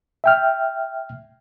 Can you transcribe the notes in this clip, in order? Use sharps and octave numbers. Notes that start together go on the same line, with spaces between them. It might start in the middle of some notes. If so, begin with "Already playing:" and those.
E5 G5 F6